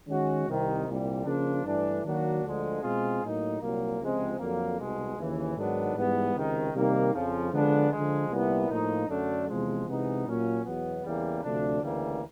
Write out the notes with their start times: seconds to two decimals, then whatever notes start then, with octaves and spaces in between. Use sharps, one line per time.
0.08 D#3 G#3 C#4 F#4
0.48 C2 C3 D#3
0.87 C2 A#2 G3
1.25 C#3 F3 A#3 D4
1.65 G2 E3 A3 D4
2.04 D#3 F#3 A#3 D4 F#4
2.43 D2 D3 F3 G#3
2.82 B2 G#3 C4 F4 G#4
3.22 A2 F#3 A#3 D#4
3.61 C2 A#2 F#3 A#3
3.99 C#2 C3 F3 G#3 C4
4.38 F2 D3 F#3 A#3
4.78 C2 B2 G#3
5.18 D#2 C#3 E3
5.56 G#2 D#3 F#3 B3 D4
5.95 G#2 E3 G3 B3
6.34 C#2 C3 D#3
6.73 C3 D#3 G3 A#3 D#4
7.13 F2 C#3 F3
7.52 D3 F3 G#3 B3 D4
7.91 D3 F3 G#3
8.30 C2 A#2 G3 B3 E4
8.69 A2 F3 A#3 D#4
9.08 F#2 D3 F#3 A3 D4
9.48 E2 C3 F3 G#3
9.87 C3 E3 G#3 B3 D#4
10.26 A#2 F#3 A#3 C#4 F4
10.65 E2 B2 F#3 B3
11.04 E2 C#3 E3 G3 A#3
11.43 D2 C3 F3 A3 D4
11.82 D2 C#3 E3 G3 A#3